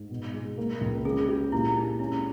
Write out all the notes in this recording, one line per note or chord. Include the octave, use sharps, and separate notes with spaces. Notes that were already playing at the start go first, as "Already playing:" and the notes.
Already playing: G#2
B2
G#3
A#3
C#2
C#3 G#4
G4
A#2 E4
G#3 D#4
C#4 E4